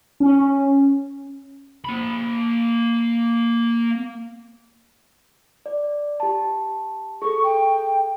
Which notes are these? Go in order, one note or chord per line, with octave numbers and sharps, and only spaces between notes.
C#4
A#3 B5
D5
G4 A5
G#4 A4 C#6
G5